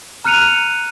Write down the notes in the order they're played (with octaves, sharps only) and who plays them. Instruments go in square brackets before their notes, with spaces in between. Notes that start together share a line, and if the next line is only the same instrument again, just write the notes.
[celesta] A#5 F6 F#6 C#7 D#7 F7